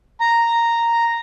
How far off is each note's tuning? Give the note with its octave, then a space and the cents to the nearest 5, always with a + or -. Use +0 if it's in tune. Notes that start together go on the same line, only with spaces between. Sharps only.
A#5 -5